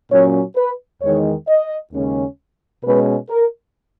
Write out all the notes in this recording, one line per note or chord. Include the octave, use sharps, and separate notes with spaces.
A#2 F#3 C#4 C#5
B4
E2 D#3 G#3 D#4 C#5
D#5
D#2 C#3 G#3 C#4
B2 G#3 C#4 B4
A#4